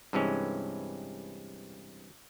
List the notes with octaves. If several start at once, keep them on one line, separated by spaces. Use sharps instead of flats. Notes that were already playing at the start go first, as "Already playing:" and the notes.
G2 C3 E3 G#3 C#4